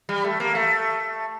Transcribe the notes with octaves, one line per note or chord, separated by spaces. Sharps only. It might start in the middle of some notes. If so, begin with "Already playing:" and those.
G3
A3
A#3
A3